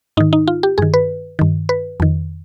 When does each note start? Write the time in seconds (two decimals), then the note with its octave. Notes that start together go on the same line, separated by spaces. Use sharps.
0.17 G#2 D#3 D#4
0.33 D#4
0.48 F4
0.63 G4
0.78 G2 D#3 G#4
0.94 B4
1.39 G2 D#3
1.69 B4
2.00 F2 D#3